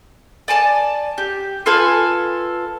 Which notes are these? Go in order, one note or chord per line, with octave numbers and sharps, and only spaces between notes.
D5 G#5 A5
G4
F4 A4 B4 G#5